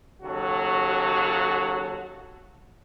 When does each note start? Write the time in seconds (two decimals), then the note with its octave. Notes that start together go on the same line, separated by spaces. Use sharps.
0.22 D#2 C#3 F#3 F#4 A4